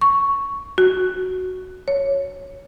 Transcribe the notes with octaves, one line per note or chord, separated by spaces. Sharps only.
C#6
F#4
C#5